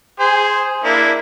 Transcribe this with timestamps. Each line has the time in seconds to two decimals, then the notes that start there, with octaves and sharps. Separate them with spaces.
0.20 G#4 C5
0.84 A#3 D4 E4